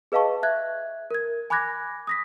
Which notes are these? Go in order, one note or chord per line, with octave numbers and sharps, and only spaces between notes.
G#4 B4 D#5 F5 A5 C#6
E5 F#6 G#6
A#4 G#6
G#5 B5 D6 F#6 G#6 A#6
D#6 A#6 B6